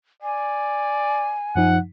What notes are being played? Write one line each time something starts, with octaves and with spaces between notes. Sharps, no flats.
D5 G#5
F#2 F3 D#4 F#5